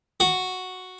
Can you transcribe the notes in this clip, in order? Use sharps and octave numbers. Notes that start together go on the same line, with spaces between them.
F#4